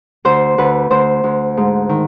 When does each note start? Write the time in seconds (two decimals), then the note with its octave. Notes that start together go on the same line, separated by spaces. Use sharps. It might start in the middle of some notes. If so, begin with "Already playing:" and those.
0.25 D2 C5
0.58 D2 B4
0.90 D2 C5
1.24 D2
1.57 G#2
1.89 D#3